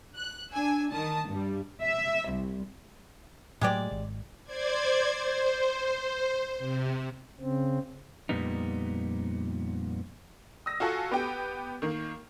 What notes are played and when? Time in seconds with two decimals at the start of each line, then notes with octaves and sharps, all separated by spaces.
0.15 F#6
0.53 D4 G#5 E6
0.92 D#3 A5 D#6
1.28 G2 G3
1.83 E5
2.31 C2
3.61 A2 F#3 G#3 G4 D5
3.91 G#1
4.44 C5 D5 G#6
5.14 C5
6.58 C3
7.40 C#3 C4
8.29 F2 A#2 G3 B3 D#4
10.66 D#6 E6 A#6
10.80 F4 F#4 A4 G#5 C#6
11.11 B3 G4 G5
11.82 D#3 A#3